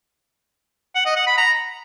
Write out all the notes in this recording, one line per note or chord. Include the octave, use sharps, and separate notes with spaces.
F#5
D#5
F#5
B5
A#5